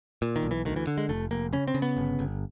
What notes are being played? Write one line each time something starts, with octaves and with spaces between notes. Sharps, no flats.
A#2
D#3
B1
E3
D2 D#3
E3
D3
G#3
F1 A3
F1 A#3
C#3 C#4
C4
C#3
B3
G1
G1